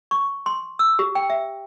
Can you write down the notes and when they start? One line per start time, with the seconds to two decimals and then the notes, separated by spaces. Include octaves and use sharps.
0.11 C#6
0.46 C6
0.79 E6
0.99 G4
1.15 G5
1.30 E5